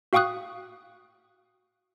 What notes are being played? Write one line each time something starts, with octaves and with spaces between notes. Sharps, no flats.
F#4 F5 G5 C#6 D#6 F#6